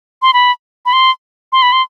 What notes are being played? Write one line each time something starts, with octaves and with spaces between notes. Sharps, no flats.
C6
B5
B5
C6
C6
B5
C6